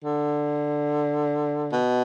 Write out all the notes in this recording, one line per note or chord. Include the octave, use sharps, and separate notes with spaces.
D3
B2